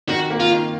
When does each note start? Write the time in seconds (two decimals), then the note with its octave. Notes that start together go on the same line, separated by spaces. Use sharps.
0.08 D#3 F#4
0.30 A#3
0.40 F4
0.51 D#3